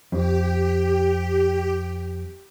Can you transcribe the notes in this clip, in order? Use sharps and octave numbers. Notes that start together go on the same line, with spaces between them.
F2 G4